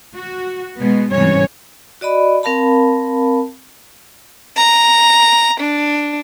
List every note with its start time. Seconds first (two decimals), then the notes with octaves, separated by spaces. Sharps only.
0.17 F#4
0.79 B2 G#3 B3
1.12 G#2 C3 E3 G3 C#4 C#5
2.01 F#4 D5 D#5 B5
2.43 C4 A#4 F5 A5 B5
4.57 A#5
5.61 D4